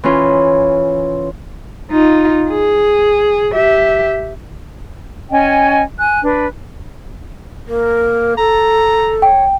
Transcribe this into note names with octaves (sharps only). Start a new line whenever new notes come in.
E3 C#4 F4
D#4 F4
G#4
G4 E5
C#4 D#5 G5 G#5
G#5 F#6
D4 B4
A#3 A#4
A4 A#5
C#5 G5